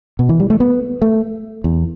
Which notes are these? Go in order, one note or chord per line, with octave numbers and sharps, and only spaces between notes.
B2
E3
G3
A3
B3
A3
E2